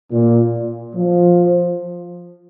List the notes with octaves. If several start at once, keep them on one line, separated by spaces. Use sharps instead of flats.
A#2
F3